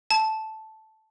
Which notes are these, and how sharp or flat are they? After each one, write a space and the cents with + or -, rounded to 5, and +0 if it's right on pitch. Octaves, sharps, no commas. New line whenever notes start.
A5 -5